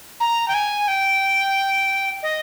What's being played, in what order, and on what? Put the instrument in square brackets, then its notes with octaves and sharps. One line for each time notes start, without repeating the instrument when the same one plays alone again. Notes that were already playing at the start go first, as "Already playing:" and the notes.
[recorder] A#5
G5
G#5
G5
D#5